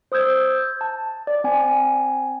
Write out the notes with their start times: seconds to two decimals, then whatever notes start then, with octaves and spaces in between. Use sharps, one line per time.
0.12 C5 D#6 E6 G6 G#6
0.81 A5
1.27 D5
1.44 C4 G#5